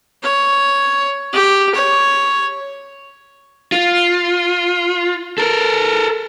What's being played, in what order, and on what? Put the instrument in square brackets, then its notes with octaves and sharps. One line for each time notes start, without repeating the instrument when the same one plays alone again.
[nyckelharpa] C#5
G4
C#5
[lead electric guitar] F4
A4 A#4